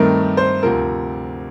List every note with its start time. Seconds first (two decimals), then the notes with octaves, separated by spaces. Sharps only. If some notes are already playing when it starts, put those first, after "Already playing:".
Already playing: G2 D#3 A3 C4 A#4
0.37 C5
0.63 D2 C3 F3 C4 A#4